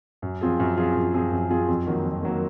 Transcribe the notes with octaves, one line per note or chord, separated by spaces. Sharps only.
F#2
F3 C4 F4 G#4
F#2
F3 C4 F4 G#4
F#2
F3 C4 F4 G#4
F#2
F3 C4 F4 G#4
F2
D#3 F#3 A#3
F2
D#3 F#3 A#3